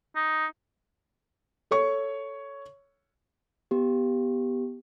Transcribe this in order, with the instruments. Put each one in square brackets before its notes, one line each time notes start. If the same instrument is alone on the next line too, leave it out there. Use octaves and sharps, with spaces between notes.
[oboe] D#4
[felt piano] A4 C#5 C#6
[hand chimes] B3 G4